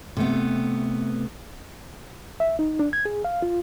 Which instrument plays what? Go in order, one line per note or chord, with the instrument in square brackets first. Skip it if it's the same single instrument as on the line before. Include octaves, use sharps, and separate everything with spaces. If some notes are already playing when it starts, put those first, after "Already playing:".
[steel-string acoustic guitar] C3 A3 B3
[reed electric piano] E5
D#4
D4
G#6
G#4
F5
F4